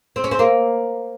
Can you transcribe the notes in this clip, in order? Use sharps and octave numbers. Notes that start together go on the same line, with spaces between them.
C4
C#4
C4
A#3